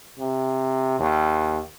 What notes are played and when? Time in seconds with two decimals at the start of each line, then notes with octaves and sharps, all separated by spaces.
0.18 C3
0.99 D#2